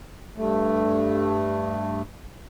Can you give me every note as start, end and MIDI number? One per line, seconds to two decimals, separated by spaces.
0.37 2.02 43
0.37 2.02 57